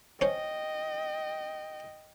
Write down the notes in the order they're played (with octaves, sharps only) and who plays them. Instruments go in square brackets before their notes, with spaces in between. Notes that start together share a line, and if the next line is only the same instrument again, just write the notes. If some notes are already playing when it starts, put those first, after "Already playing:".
[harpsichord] C#4 C5 [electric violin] D#5 G5